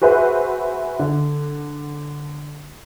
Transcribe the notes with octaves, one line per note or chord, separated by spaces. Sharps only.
F#4 G#4 B4 C5 E5
D3